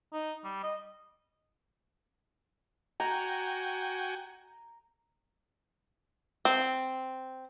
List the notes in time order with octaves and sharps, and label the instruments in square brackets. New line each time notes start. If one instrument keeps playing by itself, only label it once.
[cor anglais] D#4
G3
D#5
[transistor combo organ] F#4 G5 G#5 [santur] A#5
[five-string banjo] C4